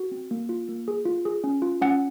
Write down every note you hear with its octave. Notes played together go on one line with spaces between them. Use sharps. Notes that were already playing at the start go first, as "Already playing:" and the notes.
Already playing: F#4
C4
A#3
F4
A#3
G#4
F4
G#4
C#4
F4
C#4 F#5